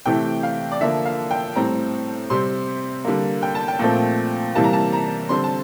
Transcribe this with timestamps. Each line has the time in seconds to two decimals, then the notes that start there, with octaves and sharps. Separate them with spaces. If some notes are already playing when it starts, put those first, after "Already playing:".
0.06 C3 E3 A3 G5
0.43 F5
0.72 D5
0.81 D3 F3 A#3 E5
1.05 F5
1.31 G5
1.55 A2 G3 C4 A#5
2.30 C3 G3 C4 C6
3.05 D3 G3 A#3
3.43 G5
3.55 A5
3.68 G5
3.79 A#2 F3 A3 C4
4.55 C3 E3 G3 A#3 A5
4.64 A#5
4.73 A5
4.92 A#5
5.29 D3 G3 C4 C6
5.44 A5